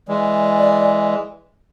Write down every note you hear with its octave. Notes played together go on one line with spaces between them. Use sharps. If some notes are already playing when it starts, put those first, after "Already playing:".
E3 G#3 D5